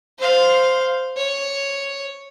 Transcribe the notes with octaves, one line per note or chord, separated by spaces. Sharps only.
C5 F5
C#5